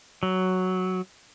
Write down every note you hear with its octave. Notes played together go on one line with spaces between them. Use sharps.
F#3